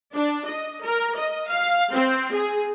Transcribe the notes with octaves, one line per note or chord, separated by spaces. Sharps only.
D4
D#5
A#4
D#5
F5
C4
G#4